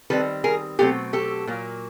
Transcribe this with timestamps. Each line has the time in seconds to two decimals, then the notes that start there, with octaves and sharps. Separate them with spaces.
0.10 D#3 G3 C4 A4 B4
0.44 G#4 A#4
0.79 B2 F#3 A3 C4 G4 A4
1.13 G4 A4
1.47 A#2 F#3 A#3